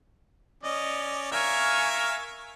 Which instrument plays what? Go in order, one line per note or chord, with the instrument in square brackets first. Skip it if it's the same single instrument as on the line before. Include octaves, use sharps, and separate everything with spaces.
[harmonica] C#4 D5 [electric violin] D#5
[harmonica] A#4 E5 F5 [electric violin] G#5 C#6